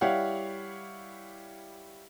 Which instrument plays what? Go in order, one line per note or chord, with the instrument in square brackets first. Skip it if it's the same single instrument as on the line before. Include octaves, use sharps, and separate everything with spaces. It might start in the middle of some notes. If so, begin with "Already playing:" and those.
[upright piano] G3 E4 G4 C#5 F5 F#5